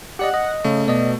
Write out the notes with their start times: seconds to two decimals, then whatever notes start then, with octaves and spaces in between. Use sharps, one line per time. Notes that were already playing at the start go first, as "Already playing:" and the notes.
0.19 G4 D5 D#5 F#5
0.34 D#5
0.64 C#3 A3
0.88 B2 D5 D#5